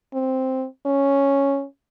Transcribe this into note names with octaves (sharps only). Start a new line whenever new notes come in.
C4
C#4